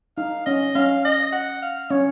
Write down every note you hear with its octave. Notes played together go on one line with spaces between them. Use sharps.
D#4 F5
C#4 D#5
C#4 F5
D#5
F#5
F5
C#4 C#5